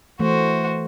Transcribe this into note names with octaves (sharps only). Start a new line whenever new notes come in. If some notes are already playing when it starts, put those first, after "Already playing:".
E3 A3 F#4 C5